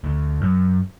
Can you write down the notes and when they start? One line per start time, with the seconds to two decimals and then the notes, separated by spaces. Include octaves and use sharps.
0.04 D2
0.41 F#2